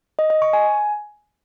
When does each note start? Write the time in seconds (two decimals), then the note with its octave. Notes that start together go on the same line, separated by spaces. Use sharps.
0.19 D#5
0.30 D#5
0.42 C#6
0.53 G#5